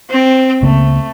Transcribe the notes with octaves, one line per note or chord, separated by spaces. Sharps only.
C4
C#2 C#3 A3 A#3